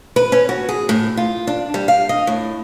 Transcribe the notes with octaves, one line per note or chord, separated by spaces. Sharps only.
B4
C#4
F#4
G#4
A2
F4
D4
G3
F5
D#5
A2